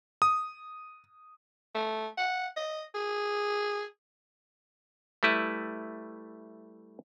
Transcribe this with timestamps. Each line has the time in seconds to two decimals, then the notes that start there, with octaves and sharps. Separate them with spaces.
0.22 D#6
1.75 A3
2.17 F#5
2.57 D#5
2.95 G#4
5.23 G3 A3 E4 B4